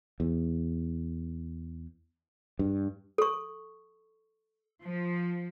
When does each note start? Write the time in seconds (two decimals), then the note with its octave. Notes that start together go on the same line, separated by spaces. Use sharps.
0.20 E2
2.59 G2
3.18 A4 C#6
4.84 F3